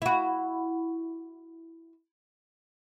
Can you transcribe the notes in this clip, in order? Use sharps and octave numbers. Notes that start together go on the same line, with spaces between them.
E4 F#4